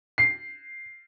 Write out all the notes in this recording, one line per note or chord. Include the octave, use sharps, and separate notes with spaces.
C7